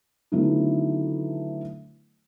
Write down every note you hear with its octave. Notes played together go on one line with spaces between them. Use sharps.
D3 D#3 F#3 A3 B3 E4